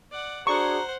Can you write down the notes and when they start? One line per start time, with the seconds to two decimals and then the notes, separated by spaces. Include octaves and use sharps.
0.11 D5 F#5
0.47 D4 F#4 G#4 C5 F#5 A#5 C#6